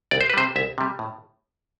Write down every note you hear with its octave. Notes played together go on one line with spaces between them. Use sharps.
C2 D5
C5
B4
C3 G3 C5
C2 E5
C3 G3
A2